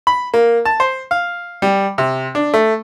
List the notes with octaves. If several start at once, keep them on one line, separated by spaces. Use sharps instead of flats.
B5
A#3
A5
C5
F5
G3
C3
D4
A3